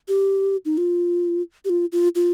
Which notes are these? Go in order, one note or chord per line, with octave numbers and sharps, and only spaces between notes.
G4
D#4
F4
G4
F4
F4
F4